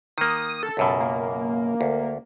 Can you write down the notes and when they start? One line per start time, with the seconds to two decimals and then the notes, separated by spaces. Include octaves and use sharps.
0.18 D#3 A#3 D#6
0.63 A4
0.77 C#2 F#2 B2
1.00 A#3
1.81 D2